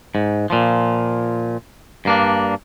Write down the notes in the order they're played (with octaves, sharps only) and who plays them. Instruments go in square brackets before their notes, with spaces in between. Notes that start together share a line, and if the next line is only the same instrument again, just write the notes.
[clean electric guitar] G#2
A#2 F3
G2 A#3 D4